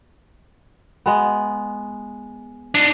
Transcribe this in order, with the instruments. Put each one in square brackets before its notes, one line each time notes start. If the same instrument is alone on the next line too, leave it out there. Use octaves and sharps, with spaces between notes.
[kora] G#3 B3
[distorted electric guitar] D4 D#4